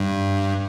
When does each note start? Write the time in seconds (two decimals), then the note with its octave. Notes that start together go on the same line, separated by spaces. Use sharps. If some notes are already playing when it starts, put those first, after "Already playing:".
Already playing: G2